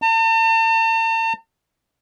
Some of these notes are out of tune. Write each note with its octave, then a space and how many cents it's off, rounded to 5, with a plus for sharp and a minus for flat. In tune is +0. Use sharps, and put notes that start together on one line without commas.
A5 +45